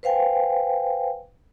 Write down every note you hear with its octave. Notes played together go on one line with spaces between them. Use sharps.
B4 C5 F5 G5 G#5